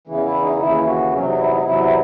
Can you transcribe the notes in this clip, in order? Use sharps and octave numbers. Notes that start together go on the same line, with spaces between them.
E2 C#3 E3
E4
D#4
D#2 C#3 E3 E4
E4
F#4
E2 C3 F#3 C#4
D#4
E4
D#4
E2 C3 F#3 E4